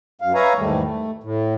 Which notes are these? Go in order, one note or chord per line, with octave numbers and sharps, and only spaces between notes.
F#2 F5
B4 C#5 E5 F5 G#5 A#5
E2 G#2 D#3 G3 A3
A3
A2